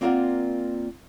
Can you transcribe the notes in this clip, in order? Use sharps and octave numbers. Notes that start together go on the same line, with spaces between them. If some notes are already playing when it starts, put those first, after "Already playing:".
A#3 C4 F4 A#4 D5 F#5